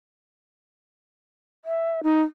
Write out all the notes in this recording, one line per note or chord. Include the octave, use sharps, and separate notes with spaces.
E5
D#4